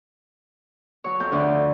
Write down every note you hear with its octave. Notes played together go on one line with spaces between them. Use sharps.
F#3 C#5
F2 G6
D2 D3 D5